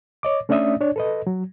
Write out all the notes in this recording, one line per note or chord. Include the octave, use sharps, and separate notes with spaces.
C#5 D#5 D6
A3 C#4 D4 D5 E5 D#6
D4 C#5 D5
A4 B4 D#5
F#3